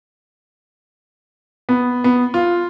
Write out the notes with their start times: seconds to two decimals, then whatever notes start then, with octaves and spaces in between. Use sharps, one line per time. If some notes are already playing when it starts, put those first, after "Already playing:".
1.69 B3
2.04 B3
2.34 F4